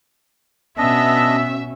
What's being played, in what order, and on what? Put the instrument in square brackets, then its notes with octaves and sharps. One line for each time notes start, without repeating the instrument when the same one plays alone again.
[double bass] B2 C#4 [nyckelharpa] B3 [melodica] D4 D#5 [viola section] E5